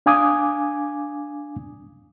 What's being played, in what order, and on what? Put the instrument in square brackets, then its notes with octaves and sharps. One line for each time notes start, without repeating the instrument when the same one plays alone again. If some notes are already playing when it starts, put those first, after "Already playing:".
[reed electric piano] D4 F5 G#5 D6 D#6 G#6